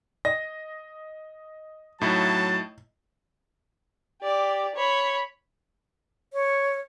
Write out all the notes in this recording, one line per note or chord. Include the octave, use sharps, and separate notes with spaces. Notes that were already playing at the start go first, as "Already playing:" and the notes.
D#5 A#6
A2 F#3 D#4 E4 A5
G4 D5
C#5 B5
C#5